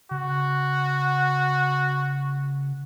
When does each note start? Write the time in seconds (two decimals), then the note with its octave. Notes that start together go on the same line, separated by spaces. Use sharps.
0.11 C#3 F#4